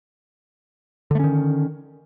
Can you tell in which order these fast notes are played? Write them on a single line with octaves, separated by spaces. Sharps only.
D3 A3 C#4 D#3